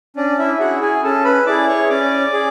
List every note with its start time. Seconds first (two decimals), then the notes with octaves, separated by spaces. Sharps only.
0.16 C#4 D4 D5
0.38 E4 E5
0.59 E4 F#4 G#4 F#5
0.81 G#4 G#5
1.04 C#4 A4 A5
1.24 B4 B5
1.46 E4 G#4 D5 D6
1.68 C#5 C#6
1.89 C#4 D5 D6
2.33 G#4